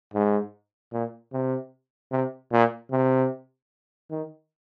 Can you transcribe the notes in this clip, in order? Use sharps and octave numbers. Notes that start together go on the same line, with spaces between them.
G#2
A#2
C3
C3
A#2
C3
D#3